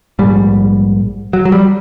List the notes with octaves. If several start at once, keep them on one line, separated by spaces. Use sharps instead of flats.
A#1 G#2 G3
F#3
F#3
G3